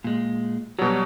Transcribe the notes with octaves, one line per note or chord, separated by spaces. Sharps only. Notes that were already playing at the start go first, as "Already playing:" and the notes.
A#2 G#3
B2 F#3 G3